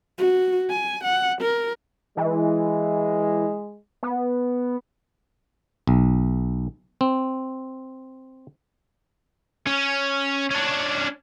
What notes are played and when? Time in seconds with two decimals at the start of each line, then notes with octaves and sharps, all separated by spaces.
0.18 F#4
0.70 G#5
1.04 F#5
1.41 A#4
2.17 E3 G#3
4.03 B3
5.87 B1
7.01 C4
9.67 C#4
10.51 C#4 D4